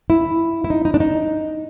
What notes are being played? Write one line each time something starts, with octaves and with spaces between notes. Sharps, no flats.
E4
E4
D#4
D#4
D4
D#4